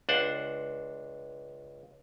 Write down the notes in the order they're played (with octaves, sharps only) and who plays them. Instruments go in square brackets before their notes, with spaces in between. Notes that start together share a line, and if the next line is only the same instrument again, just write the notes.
[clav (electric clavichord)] C#2 D4 C5 F#5